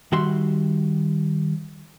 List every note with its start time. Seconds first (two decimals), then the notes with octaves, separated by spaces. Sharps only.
0.12 D#3 G3 F#4 E5 C6